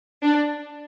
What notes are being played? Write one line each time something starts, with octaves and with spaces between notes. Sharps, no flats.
D4